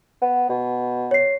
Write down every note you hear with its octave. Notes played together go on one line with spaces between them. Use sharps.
B3
B2
C#5 C7